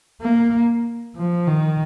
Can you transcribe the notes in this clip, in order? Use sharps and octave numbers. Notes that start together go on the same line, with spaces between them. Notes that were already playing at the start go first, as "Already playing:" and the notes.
A#3
F3
D#3